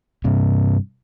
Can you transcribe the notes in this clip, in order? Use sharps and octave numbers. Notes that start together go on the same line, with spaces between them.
G2 C3